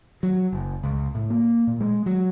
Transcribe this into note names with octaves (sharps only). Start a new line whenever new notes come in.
F#3
F#1
C#2
A2
A#3
A#2
G#3
F#3